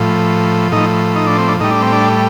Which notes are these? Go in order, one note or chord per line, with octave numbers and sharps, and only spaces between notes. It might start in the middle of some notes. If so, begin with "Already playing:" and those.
Already playing: A2 F3
A2 F3 D#4
D#4
D4
C4
D4
A2 G3 D#4
D4
C4
D4